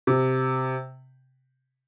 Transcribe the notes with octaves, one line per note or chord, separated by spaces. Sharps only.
C3